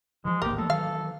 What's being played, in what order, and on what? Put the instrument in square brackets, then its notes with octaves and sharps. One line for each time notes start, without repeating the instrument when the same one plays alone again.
[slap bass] E3 F3 [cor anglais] G#3
[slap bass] D1 G#1 A#3 [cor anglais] G4 [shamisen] A#4
[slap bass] F3 A3 A#3 [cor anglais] A4
[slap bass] D#3 E3 F#3 [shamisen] F5